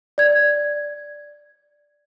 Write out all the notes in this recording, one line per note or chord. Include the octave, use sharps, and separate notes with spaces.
D5 G#6